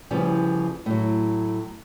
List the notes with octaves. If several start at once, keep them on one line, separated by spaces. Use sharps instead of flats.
D2 C#3 E3 F3 G3
A2 F#3